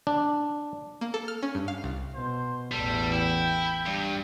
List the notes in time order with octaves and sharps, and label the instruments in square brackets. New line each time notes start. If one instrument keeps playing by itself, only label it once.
[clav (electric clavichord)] D4
[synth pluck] A#3
A4
F6
C#4
G2
F5
C2
[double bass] B2 [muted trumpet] C5
[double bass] A1 E2 [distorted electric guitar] G3 [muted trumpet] A4
[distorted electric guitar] E4 [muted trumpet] G5
[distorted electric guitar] G2 [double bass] G3